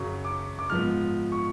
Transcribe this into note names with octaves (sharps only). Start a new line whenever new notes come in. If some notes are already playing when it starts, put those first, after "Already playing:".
Already playing: F#2 C#3 F#3 C#6
D6
D6
G#2 F3 B3 F6
C#6